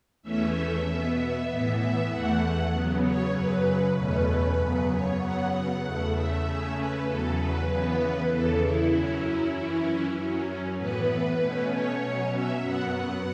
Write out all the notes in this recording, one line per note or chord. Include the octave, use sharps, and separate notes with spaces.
E2 E3 A3 C#4 E5
B2 B3
E5
A2 E3 B3 E5
E5
E2 E3 A3 F#5
C#3 F#3 B3
C#5
F#2 C#3 F#3 B4
E2 B2 A3 C#4 B4
B4
F#2 C#3 F#3 B3
C#5
C#3 F#3 B3 F#5
F#5
E2 C#3 A3
E5
C#3 A3 C#4
B4
E2 C#3 F#3 A4
B4
C#3 E3 B3
E2 C#3 E3 A4
E4
F#2 F#3 C#4
E4
F#2 E3 C#4
F#2 F#3 C#4
A2 E3 B3 B4
B4
B2 A3 C#4
C#5
B2 F#3 C#4
E5
F#2 F#3 B3 F#5